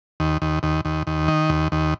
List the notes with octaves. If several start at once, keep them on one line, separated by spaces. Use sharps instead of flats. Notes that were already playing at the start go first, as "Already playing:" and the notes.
D#2
D#2
D#2
D#2
D#2
D#3
D#2
D#2